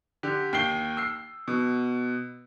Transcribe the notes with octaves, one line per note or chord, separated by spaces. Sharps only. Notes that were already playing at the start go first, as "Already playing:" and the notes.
D3 G4
D#2 G5 C7 G7
E6 C7
B2